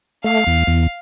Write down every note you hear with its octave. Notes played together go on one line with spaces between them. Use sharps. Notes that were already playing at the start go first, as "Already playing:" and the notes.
A3 F5
E2
E2